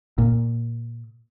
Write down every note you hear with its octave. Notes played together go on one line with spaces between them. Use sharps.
A#2